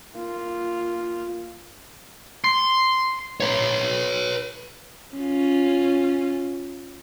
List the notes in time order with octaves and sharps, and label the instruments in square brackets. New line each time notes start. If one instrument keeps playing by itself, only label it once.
[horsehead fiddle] A#3 F4
[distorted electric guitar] C6
B4 C#5
[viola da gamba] C#4 F4